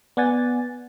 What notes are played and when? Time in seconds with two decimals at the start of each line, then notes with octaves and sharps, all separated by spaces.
0.17 B3 D5 F#5 G#5 A6